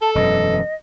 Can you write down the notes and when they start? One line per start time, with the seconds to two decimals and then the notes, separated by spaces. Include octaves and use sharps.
0.01 A4 A5
0.15 E1 F#2 E3 D#5